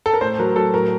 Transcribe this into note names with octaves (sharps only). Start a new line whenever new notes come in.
A4
A#4
A2 C5
F#3 A#4
F#3 A4
A2 A#4